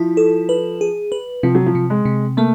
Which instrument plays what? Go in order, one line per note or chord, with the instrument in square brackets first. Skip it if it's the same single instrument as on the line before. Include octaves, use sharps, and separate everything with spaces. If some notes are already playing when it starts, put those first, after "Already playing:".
Already playing: [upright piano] F3 [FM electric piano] E4
[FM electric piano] A4
B4
G#4
B4
[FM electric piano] C3 [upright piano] F3
[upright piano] F#3
F3
[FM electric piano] C3
[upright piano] G#3
[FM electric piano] C3
[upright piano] A3 [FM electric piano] A#3